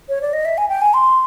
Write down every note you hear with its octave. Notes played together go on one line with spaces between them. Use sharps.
C#5
D5
D#5
E5
G#5
G5
G#5
C6